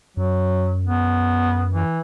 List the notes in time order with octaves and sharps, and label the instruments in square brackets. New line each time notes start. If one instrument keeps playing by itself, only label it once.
[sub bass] F#2 [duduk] F#3
[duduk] B3
E3